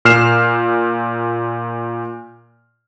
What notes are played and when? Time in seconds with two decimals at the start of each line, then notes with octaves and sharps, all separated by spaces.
0.05 A#2 F6 C7 E7